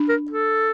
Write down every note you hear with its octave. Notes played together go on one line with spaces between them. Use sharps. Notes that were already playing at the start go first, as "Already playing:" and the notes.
Already playing: D4
A#4
A4